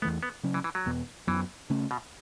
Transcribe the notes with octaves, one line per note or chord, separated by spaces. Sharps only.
E2 E3 A3 B3
B3
C#3 F#3 C#4
E3
E3
F#3
E2 B2 B3
F#2 E3 F#3 B3
C#3 A3 C#4
B2